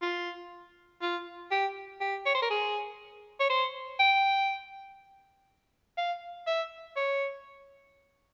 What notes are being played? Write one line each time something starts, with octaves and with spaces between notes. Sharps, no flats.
F4
F4
G4
G4
C#5
C5
A#4
G#4
C#5
C5
G5
F5
E5
C#5